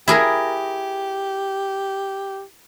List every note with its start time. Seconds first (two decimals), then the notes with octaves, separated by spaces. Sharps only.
0.08 E4 G4 G#4 A#4